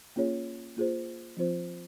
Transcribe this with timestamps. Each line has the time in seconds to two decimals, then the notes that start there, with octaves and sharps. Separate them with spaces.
0.16 A#3 C#4 F4 G#4 C#5
0.77 A#3 F4 G#4 C5
1.37 F3 C4 F4 C5